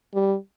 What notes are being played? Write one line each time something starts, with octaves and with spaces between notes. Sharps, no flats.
G3